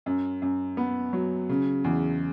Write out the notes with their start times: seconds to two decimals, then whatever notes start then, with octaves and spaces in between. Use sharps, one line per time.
0.06 F#2
0.42 F#2
0.77 B3
1.13 F#3
1.49 C#3
1.84 E2